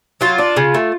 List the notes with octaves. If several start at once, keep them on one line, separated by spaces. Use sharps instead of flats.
F#3 F4
D4
C#3
A3